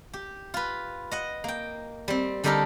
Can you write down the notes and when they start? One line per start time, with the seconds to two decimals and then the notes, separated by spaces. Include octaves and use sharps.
0.13 G4
0.54 F4 B4
1.11 D#5 F#5
1.44 A#3 G5
2.08 G3 C4
2.44 D3 G3 D#4 G4 A4 A#4